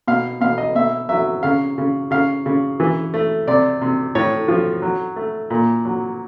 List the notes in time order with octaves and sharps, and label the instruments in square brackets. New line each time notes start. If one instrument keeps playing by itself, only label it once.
[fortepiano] B2 F5
B2 F5
D#5
B2 E5
F#3 E5
C#3 F5
C#3
C#3 F5
C#3
E3
A3
C3 D5
C3
A2 C#5
F3
F#3
A3
A#2
F#3